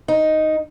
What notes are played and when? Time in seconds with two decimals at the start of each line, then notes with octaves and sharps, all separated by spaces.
0.08 D#4